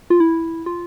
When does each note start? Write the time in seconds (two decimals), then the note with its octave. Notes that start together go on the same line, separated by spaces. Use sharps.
0.10 F4
0.20 E4
0.66 F4